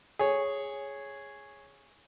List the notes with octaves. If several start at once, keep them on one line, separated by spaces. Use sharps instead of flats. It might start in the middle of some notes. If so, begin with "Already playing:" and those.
G#4 C#5